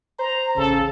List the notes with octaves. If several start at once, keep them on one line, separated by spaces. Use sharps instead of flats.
C5 A#5
A1 C#3 A4